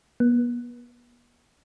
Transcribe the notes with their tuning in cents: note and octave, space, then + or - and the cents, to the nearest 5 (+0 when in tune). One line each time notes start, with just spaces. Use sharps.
B3 -40